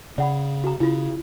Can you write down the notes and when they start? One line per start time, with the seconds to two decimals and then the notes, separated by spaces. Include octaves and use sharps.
0.18 C#3 D5 F#5 B5
0.64 F#4 A#5
0.80 C#3 E4 F4